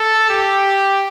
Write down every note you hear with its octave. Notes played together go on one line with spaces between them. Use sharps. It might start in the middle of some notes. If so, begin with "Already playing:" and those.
Already playing: A4
G4